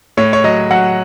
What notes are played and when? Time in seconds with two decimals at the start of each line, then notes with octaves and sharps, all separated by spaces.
0.17 A2 C#5
0.33 C#5
0.44 F#3 D#5
0.71 F#3 F#5